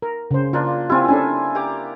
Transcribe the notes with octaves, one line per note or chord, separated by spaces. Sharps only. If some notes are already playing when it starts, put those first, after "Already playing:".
A#4
C#3 C5
F3 A#3 D4 F4
C4 E4 F4 G4 G#5
C#4 D4 A4 G#5
G4 A#5 D6